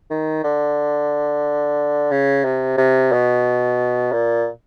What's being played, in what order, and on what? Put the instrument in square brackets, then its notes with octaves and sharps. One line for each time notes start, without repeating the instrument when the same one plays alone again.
[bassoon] D#3
D3
C#3
C3
C3
B2
A#2